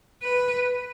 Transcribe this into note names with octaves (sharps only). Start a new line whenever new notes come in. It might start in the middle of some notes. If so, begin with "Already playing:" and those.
B4